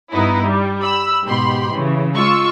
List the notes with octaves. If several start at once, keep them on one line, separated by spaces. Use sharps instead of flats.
G2 B3 D#4 E4
G3
B5 E6
G#2 B2 G4 B5 C6
C#3 E3
G#3 F4 C#6 E6